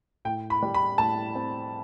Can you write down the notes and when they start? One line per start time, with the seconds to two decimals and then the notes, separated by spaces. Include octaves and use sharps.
0.25 A2 G5
0.50 B5
0.62 G3
0.74 B5
0.98 A2 A5
1.35 C4